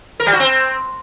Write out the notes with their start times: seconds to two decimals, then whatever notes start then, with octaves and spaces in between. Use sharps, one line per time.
0.20 A#4
0.26 G3
0.33 F#4
0.40 C4